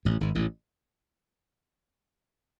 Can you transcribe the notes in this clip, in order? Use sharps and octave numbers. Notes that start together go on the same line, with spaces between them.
A1 A2
G#1 G#2
A1 A2